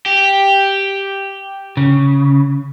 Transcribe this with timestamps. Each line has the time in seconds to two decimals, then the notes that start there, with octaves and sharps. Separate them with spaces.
0.06 G4
1.77 C#3